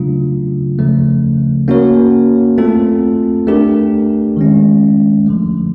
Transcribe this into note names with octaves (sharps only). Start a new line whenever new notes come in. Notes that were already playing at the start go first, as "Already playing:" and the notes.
Already playing: C#3 F#3 A3 D4 F4
C#3 F3 A3
A#3 C#4 F#4 A#4 C#5
A3 C4 F4 A4
A3 D4 G4 A#4
D#3 G#3 C#4
D3 F3 A3